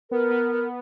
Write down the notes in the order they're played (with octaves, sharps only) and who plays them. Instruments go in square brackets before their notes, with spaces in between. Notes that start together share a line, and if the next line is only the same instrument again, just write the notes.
[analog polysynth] B3 [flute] A#4
[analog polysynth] B3
B3